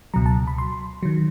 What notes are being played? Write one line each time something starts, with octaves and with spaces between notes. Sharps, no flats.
C#2 B2 F#3 A#5
A5
B5
C6
D#3 F#3